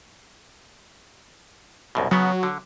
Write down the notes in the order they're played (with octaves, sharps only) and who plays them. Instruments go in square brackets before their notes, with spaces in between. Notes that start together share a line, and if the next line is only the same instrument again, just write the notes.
[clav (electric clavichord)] C2 F#2 B2
[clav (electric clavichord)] C#3 B3 [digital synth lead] F#3
[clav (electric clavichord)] D3